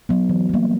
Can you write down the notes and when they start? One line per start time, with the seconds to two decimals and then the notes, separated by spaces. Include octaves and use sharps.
0.09 F#3 B3
0.29 E3
0.49 G3 A#3